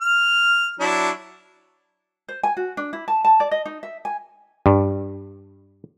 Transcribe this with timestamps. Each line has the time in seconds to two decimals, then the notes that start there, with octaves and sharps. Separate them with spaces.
0.02 F6
0.80 F#3 D4 E4
2.28 C5
2.43 G#5
2.57 F#4
2.77 D4
2.93 E4
3.08 A5
3.25 A5
3.40 D5
3.51 D#5
3.66 D#4
3.83 E5
4.05 G#5
4.66 G2